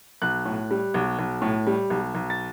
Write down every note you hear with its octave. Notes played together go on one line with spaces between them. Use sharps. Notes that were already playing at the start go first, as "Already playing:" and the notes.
B1 F#6
A2
G3
B1
B1
A2
G3
B1
B1
A6